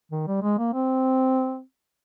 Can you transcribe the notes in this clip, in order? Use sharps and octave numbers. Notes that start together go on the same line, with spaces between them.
D#3
G3
G#3
A#3
C4